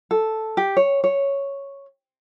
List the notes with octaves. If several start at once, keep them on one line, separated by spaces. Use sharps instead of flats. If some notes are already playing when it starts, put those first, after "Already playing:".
A4
G4
C#5
C#5